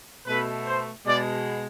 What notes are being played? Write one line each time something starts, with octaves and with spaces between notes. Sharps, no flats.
B2 A3 B4
C5
B2 G#3 D5